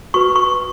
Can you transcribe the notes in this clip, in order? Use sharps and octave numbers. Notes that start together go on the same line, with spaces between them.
F#4 B4 C#6
C#6